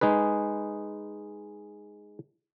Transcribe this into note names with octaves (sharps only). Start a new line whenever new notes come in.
G#3 D#4 G#4 B4